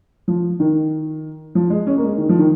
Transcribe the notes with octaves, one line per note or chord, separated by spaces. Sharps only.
F3
D#3
F3
G#3
C#4
A#3
G#3
D#3
F3
D#3